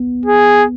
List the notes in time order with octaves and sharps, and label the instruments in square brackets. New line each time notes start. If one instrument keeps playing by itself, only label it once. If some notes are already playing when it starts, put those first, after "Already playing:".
Already playing: [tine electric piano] B3
[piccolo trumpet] G#4